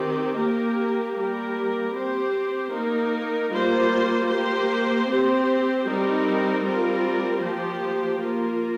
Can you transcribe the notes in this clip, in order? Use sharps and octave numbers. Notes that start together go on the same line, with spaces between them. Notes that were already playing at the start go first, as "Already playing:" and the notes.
Already playing: D#3 C4 G4
A#3 G4 A#4
G3 A#3 G4 A#4
C4 G4 C5
A#3 D#4 A#4
G3 A#3 F4 C5
A#3 G4 C5
C4 G4 C5
G3 C4 D#4 A#4
G3 C4 F4 A#4
F3 A#3 G4 C5
A#3 F4 A#4